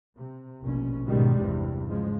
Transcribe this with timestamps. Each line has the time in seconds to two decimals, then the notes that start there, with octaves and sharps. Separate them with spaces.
0.15 C3
0.63 F1 A#1 B2 C#4
1.07 C#2 G#2 B2 D#3 G3 G#3
1.38 G#1 E2 G2 C3
1.87 G#2 C#3 F3 G#3